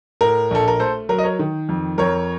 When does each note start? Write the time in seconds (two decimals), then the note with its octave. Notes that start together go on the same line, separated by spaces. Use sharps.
0.21 A2 A#4
0.51 A#1 A4
0.68 A#4
0.80 A3 A4 C5
1.09 F#3 A#4
1.18 D#5
1.24 A#4 C#5
1.39 D#3
1.69 F2
1.98 F2 A#4 C#5